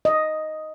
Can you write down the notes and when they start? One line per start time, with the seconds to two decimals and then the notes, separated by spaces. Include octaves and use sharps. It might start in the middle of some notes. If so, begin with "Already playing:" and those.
0.05 D#5